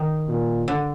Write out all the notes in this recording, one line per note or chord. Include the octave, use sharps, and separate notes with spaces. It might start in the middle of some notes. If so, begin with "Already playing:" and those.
Already playing: D#3
A#2
D3